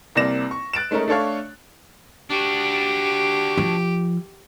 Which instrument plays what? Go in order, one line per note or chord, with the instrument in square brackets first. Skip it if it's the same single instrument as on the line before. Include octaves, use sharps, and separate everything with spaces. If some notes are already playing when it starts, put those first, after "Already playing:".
[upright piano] C2 C3 A#3 D5 A#6 E7
C#6
F#6 A6 D7 E7
G#3 A3 C#4 D#4 A#4
A3 D4 A4 C#5 F5
[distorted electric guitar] D4 F#4 [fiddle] G4
[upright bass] F3